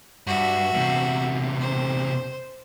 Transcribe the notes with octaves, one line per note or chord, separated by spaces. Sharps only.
G2 F#4 E5
E2 C3
C5